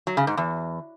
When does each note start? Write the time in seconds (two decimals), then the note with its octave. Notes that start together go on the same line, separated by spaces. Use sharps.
0.07 F#3
0.17 C#3
0.27 G#2
0.37 E2